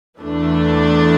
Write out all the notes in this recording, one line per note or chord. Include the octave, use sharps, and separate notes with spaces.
E2 E3 A3 D4